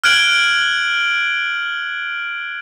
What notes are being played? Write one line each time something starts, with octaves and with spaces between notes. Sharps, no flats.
F6 F#6 G#6 D7 F#7 G7